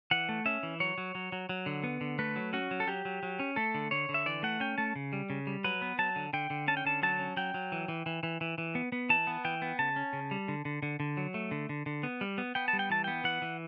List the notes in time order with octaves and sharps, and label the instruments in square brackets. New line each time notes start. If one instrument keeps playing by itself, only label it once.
[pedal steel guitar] E3 F#5
A3
C#4 E5
E3
F#3 C#5
F#3
F#3
F#3
F#3
D3
B3
D3
A3 B4
F#3
C#4 F#4
F#3
A4
F#3 G4
F#3
F#3
C#4
A3 A4
D3
D3 C#5
D3
E5
E3 D5
A3 F#5
C#4 G5
A3 A5
C#3
G3
C#3
G3
F#3 B4
B3
F#3 A5
D3
D3 G5
D3
C#4 A5
G5
D3 A5
F#3 A5
C#4
F#3 G5
F#3
E3
E3
E3
E3
E3
E3
B3
B3
E3 A5
B3
E3 G5
B3
C#3 A5
C#4
C#3
G3
D3
D3
D3
D3
F#3
A3
D3
D3
D3
B3
G3
B3
B3 G5
A5
G3
G5
E3 A5
B3 G5
E3 F#5
E3